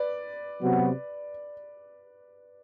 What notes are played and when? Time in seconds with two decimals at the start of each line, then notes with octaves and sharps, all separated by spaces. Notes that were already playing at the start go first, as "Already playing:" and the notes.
Already playing: B4 D5
0.60 C3 F#3 B3 F#4